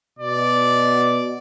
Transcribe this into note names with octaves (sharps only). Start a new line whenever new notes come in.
B2 D5